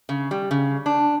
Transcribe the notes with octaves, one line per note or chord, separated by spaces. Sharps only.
C#3
G3
C#3
D4